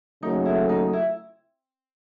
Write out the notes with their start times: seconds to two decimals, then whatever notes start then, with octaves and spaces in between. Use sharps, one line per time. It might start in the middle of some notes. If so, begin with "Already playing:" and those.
0.22 D#2 C#3 F#3 A3 D#4
0.46 E4
0.69 D#4
0.93 E4